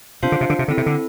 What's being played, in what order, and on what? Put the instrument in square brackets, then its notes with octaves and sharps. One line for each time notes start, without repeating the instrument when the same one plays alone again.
[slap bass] C3 [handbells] D4 F4 C5 F5
[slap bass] D3
C3
D3
C3
[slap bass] D3 [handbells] C4 E4 A4
[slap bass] C3
D3